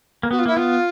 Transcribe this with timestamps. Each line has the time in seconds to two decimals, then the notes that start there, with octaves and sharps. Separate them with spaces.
0.23 A#3
0.31 B3 F#4
0.38 F4
0.46 A#3 E4
0.56 B3 F4